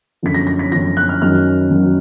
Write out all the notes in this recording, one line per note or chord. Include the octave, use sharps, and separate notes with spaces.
F#2 D3 F3 B6
A#6
A#6
B6
F#2 D3 F3 A#6
F#6
F6
F#2 D#3 F#3 F6
F#2 D#3 F#3